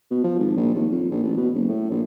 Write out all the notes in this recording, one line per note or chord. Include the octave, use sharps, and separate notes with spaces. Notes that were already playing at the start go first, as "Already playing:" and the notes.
B2
F3
G#1
A#1
D#2
F2
A#1
A1
B2
F#1
A2
A#1